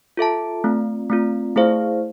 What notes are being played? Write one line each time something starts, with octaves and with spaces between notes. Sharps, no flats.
F4 A4 E5 A5
A3 C4 F4
A3 C4 F4
A3 E4 G#4 C5 F5